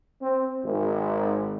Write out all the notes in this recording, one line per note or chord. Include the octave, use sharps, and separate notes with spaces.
C4
G#1